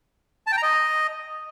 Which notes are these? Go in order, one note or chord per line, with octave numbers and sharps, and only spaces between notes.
A5
G5
A#5
D#5